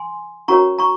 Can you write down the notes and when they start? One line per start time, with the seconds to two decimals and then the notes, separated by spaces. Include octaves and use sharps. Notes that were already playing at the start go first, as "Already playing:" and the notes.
Already playing: G#5 C6
0.48 C#4 F#4 A#4 C#5 A#5 C#6
0.79 A#5 C#6